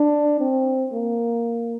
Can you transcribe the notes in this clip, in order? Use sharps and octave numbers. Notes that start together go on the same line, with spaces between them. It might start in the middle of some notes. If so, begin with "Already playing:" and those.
Already playing: D4
C4
A#3